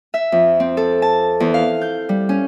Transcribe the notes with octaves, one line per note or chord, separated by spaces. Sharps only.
E5
F2
C4
A4
A5
E2
F5
G6
G3
C#4